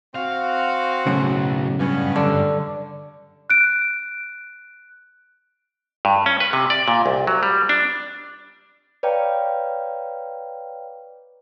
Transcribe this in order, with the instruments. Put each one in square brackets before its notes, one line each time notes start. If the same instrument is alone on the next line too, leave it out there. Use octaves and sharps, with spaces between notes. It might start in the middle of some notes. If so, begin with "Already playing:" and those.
[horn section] C4 F#4 [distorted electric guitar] F5
[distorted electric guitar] B1 [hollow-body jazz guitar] F#2 A2 C#3
[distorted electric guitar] G2 [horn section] B3 C#4
[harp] D3
[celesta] F#6 D7
[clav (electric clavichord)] G2
C#4
B4
C3
D5
A#2
C2
F#3
G3
D4
[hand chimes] B4 C#5 D5 F5 G5 A#5